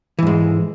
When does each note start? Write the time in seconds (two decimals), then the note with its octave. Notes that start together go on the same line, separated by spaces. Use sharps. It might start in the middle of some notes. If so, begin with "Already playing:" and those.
0.19 E3
0.23 G#2
0.27 G#3